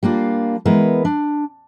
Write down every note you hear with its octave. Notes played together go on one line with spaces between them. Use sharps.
G3 A#3 D4 F4
E3 G#3 B3 E4 A#4 B4
D4